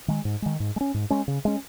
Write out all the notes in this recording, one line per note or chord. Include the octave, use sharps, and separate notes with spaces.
D#3 G#3
G#2
D#3 G#3
G#2
G#3
C#4
G#2
G#3 C#4
C#3
G#3 C#4